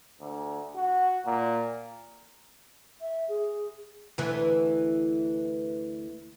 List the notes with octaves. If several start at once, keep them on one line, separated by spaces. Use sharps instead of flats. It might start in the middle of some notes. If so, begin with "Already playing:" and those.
D2
F#4
A#2
E5
G#4
D2 E3